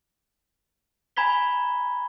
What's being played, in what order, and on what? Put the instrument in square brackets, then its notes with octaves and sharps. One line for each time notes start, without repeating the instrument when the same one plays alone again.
[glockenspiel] G#5 A#5 B5 G#6 B6 G7